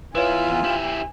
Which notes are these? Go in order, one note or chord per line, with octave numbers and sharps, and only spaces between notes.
E2 E4 F4 B4 C#5 G#5
E4 G4